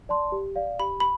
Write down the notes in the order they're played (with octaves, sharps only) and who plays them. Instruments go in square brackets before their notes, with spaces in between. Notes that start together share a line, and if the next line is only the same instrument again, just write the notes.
[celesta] D5 A5 C6
G4
D5 F5
[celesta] G4 [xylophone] B5
[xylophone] B5